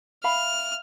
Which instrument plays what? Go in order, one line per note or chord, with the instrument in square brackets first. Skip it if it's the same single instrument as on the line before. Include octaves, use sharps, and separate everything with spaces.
[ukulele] E5 F5 B5 [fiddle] F6